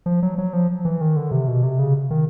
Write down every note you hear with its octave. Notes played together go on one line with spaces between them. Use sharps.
F3
F#3
F#3
F3
E3
D#3
D3
C3
B2
C3
C#3
D#3